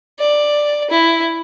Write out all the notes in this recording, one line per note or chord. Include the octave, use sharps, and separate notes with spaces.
D5
E4